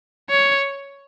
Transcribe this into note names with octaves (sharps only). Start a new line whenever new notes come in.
C#5